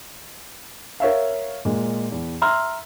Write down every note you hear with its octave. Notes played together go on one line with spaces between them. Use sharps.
A#4 C#5 E5 F5
A#2 G#3
E2
E5 A#5 C6 E6 F6